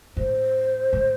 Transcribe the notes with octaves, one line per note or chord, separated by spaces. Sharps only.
A2 C5
A2